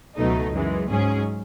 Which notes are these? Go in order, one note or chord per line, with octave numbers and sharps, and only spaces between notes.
C#2 B2 F#3 A3 D#4
F#2 E3 G#3
G#2 F#3 C#4 G#4